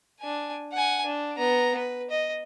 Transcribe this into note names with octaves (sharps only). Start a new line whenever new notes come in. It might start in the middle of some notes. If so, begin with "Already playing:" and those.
D4 G#5
F#5 G#5
D4
B3 A#5
B4
D#5